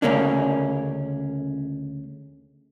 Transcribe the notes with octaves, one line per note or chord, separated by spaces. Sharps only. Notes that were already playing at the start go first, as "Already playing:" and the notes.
D2 A#2 C#3 A#3 C#4 D4